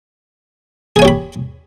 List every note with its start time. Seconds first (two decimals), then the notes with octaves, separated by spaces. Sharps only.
0.96 G#4
0.99 G#5
1.02 C#5
1.05 G4
1.08 B5